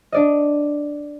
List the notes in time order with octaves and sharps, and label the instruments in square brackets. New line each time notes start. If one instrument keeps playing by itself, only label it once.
[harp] D4 D5 D#5